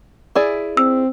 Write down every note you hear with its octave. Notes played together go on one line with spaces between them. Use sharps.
E4 G#4 D5
C4 E6